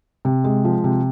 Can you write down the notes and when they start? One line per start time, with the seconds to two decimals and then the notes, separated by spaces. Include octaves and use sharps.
0.25 C3
0.44 G#3
0.65 F3
0.84 C3